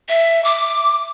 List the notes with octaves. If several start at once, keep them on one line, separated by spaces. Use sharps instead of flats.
E5
D6